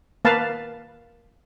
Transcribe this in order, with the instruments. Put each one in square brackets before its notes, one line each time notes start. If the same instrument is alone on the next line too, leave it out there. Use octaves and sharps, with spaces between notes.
[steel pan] A#3 B4 F5 A5